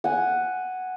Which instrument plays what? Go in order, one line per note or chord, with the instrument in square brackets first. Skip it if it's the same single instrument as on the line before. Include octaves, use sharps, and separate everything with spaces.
[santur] F#5 G#5